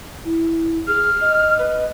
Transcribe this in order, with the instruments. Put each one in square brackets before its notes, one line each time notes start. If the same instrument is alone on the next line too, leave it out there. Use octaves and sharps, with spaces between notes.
[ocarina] E4
[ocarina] G#4 [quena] F6
[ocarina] D#5
[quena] B4